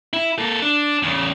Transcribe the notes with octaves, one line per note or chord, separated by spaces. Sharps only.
E4
A#3 A4
D4
E2 C#3